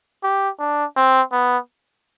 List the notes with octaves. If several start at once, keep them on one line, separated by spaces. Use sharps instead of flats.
G4
D4
C4
B3